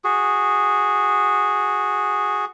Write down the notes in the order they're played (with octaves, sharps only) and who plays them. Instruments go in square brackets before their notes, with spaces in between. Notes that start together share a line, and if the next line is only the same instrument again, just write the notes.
[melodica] F#4 G#4